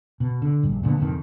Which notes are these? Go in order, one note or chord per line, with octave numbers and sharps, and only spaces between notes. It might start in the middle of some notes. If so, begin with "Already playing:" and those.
B2
D3
A#1 G2
A#2 D3 F#3 B3
F1 F2 D#3